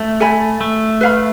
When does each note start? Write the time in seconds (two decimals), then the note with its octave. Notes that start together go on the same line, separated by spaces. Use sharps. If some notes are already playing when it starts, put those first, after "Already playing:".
Already playing: A3
0.20 A4 E5 G#5 B5
0.61 A3
1.01 B4 F5 B5